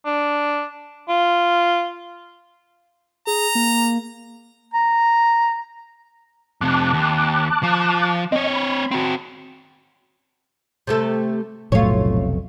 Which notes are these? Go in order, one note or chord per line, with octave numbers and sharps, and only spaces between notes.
D4
F4
G#4 A#5
A#3
A#5
F2 C3 A5 D6 F#6
D#2
F3
C4 C#5 D#5
B5
C4 F#4
C3 A3 A4
F1 B1 A2 F#3 A3 F4 C#5